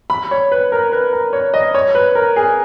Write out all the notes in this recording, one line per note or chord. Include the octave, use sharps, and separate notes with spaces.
B5
C#5
B4
A#4
B4
A#4
C#5
D#5
C#5
B4
A#4
G#4